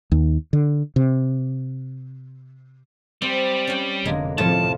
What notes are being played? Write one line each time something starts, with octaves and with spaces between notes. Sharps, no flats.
D#2
D3
C3
G3 C4
C#4 G5
F1 D3 G#3 A#3
F2 A2 C3 F3 A3 F4 A5